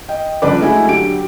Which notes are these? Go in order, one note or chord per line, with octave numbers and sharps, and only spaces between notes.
D#5 G5
G1 C#3 F3 D4 B4 D6
G#3 A3 E4 F#4 G#5
D3 F#3 G4 D7